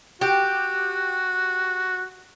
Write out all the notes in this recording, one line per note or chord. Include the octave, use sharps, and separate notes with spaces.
F#4 G4